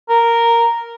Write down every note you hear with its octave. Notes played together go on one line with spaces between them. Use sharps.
A#4